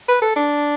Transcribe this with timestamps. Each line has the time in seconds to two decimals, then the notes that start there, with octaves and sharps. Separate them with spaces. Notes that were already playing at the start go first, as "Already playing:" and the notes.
0.08 B4
0.22 A4
0.36 D4